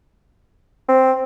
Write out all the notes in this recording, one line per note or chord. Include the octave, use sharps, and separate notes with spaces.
C4